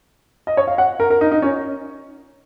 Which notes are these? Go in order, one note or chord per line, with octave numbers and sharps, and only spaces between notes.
D#5
C#5
F5
F#5
A#4
A#4
D#4
D#4
C#4